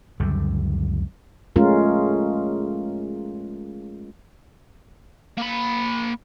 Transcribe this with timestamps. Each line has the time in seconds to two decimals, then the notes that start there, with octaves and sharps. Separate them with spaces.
0.20 C#2 F#2 D3 G3
1.56 G#3 A3 C#4 F4 A#4
5.38 A#3 B5